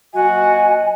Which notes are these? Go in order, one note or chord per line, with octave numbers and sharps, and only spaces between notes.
A#2 F#3 F#4 D#5 G#5